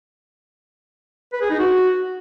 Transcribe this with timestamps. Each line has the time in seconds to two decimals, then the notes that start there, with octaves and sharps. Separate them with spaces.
1.33 B4
1.41 G#4
1.50 D#4
1.59 F#4